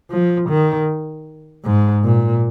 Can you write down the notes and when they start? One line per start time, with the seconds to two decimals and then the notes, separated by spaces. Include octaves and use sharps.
0.10 F3
0.49 D#3
1.65 G#2
2.05 A#2